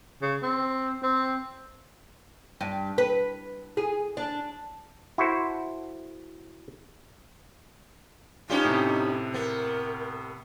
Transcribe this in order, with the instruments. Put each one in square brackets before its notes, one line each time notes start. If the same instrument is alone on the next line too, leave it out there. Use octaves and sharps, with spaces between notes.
[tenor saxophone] C#3
C4
C4
[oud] G2
B4
G#4
D4
[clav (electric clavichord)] E4 F#4 A4 C5
[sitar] B3 C#4 G4 [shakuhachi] D#4 [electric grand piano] F4
[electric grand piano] A2 C3
[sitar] B3 [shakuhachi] A#4